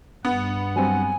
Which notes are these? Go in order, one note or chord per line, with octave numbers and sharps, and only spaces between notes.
G2 B3 F#5
F#3 G3 C4 G#5